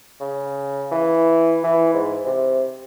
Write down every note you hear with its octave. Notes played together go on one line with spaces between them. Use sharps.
C#3
E3
E3
G#2
C3